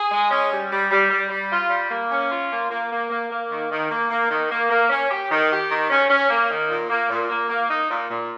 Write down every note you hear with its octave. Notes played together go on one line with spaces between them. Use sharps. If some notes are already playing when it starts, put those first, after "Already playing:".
Already playing: G#4
G#3
C#4
G3
G3
G3
G3
G3
F4
G3
A#3
C#4
F4
A#3
A#3
A#3
A#3
A#3
D#3
D#3
A#3
A#3
D#3
A#3
A#3
C#4
G4
D#3
G4
D#3
C#4
C#4
A#3
D#3
A#2
A#3
A#2
A#3
A#3
D#4
A#2
A#2